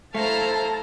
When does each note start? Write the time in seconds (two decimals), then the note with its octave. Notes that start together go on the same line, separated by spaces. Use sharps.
0.15 A3 E4 C5 F5 A5 A#5 A#6